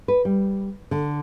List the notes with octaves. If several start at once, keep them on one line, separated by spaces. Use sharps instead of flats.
B4
G3
D3